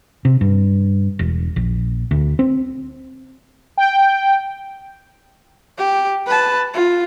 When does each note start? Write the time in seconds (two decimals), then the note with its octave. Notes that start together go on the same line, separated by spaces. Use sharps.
0.25 C3
0.41 G2
1.19 E1
1.56 A#1
2.11 D2
2.39 C4
3.78 G5
5.78 G4
6.27 B4 A5
6.74 F4